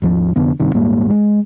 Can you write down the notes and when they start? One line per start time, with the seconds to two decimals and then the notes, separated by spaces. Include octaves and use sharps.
0.02 G#1 D#2 F3
0.36 F1 F2 D3 B3
0.60 G2 C3 D#3
0.74 D#1 G#2 G3 A#3
1.10 G#3